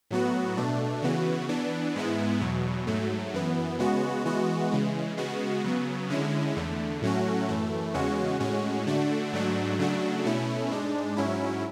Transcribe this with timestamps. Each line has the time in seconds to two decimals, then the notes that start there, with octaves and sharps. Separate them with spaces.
0.11 A2 F#3 B3 F#4
0.57 B2 A3 D4
1.02 C#3 E3 B3 F#4
1.49 E3 B3 D4
1.95 G#2 G#3 B3 E4
2.41 E2 B2 F#3
2.87 G#2 F#3 A3
3.34 F#2 E3 B3
3.79 C#3 G#3 B3 F#4
4.25 E3 G#3 B3 F#4
4.72 C#3 E3 G#3
5.17 C#3 G#3 B3 F#4
5.64 C#3 F#3 B3
6.10 D3 G#3 C#4 E4
6.56 E2 D3 A3
7.02 A2 F#3 A3 C#4 F#4
7.49 F#2 E3 A3
7.94 E2 C#3 G#3 C#4 F#4
8.40 A2 G#3 C#4 F#4
8.87 D3 A3 D4 F#4
9.33 G#2 F#3 A3 D4 F#4
9.79 C#3 F#3 A3 D4 F#4
10.25 B2 A3 C#4 E4
10.71 G#2 G#3 D4
11.17 G#2 F#3 C#4 E4